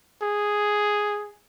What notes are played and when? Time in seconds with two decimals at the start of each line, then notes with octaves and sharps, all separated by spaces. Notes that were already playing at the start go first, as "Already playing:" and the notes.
0.22 G#4